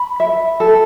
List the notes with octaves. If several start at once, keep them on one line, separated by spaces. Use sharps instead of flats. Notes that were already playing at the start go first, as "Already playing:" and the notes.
Already playing: B5
E5
A4